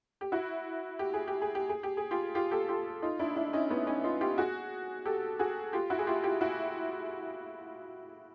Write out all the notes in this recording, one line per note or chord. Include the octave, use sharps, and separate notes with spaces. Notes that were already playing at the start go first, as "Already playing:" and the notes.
G4
E4 F#4
G4
G#4
G4
G#4
G4
G#4
G4
G#4
F4 G4
F4 G4
G4 A4
F4 G4
D#4 F4
D4 E4
D4 E4
C#4 D#4
B3 C#4
C#4 D#4
D#4 F4
F4 G4
F#4 G#4
G4 A4
F#4 G#4
F4 G4
E4 F#4
G#4
F4 G4
F4 G4
E4 F#4